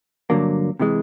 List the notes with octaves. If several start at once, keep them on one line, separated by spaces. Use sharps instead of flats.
G2 D3 F#3 A#3
C3 E3 G#3